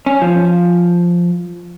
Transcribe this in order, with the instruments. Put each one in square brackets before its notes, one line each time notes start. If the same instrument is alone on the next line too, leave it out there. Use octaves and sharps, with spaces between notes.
[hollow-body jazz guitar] C#4
F3